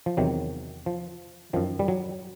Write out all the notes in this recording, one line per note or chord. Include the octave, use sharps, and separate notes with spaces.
F3
E2 C3 D#3 F#3
F3
F#2 D#3 F3
G3
F#3